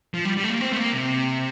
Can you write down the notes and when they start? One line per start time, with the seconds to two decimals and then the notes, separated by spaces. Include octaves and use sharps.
0.14 F3
0.25 G3
0.37 G3
0.44 A3
0.50 A#3
0.61 C4
0.73 A3
0.77 A#3
0.93 C3